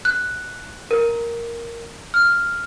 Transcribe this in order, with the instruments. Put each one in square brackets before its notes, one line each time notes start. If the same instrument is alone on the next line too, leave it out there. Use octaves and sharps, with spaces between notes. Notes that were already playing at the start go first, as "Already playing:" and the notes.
[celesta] F#6
A#4
F6